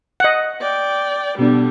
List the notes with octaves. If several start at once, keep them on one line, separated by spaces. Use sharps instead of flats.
D#5 F#5
D5 G5
B2 D3 G3 B3 D4